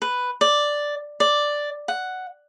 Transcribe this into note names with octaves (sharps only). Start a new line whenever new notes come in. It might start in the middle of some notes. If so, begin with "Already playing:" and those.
B4
D5
D5
F#5